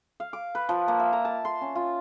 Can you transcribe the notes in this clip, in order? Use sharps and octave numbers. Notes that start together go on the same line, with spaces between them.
F5
D6
B4
F3
A#3
E5
A#5
A5
C6
C#4
F4